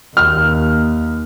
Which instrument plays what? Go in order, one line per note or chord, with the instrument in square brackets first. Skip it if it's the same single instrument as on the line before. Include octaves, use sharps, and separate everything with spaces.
[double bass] D#2 [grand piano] F6